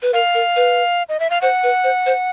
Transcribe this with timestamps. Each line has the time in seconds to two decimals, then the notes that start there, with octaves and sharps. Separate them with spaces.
0.02 B4
0.13 A#4 F5
0.34 A#4
0.56 B4
1.09 D#5
1.20 E5
1.30 F5
1.41 C5 F#5
1.63 B4
1.84 C5
2.06 C5